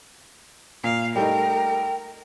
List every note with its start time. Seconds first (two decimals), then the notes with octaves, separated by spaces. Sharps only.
0.84 A#2 F5
1.16 G3 A3 D#4 A#4 G5